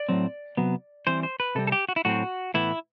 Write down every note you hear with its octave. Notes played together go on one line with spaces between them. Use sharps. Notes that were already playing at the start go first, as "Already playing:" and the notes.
Already playing: D5
A2 F#3 C4
C3 F#3 B3
E3 G3 C4 C5
C5
B4
C3 G3 C4 A4
A4
G4
F#4
E4
A2 F#3 C4 F#4
A2 E3 B3 E4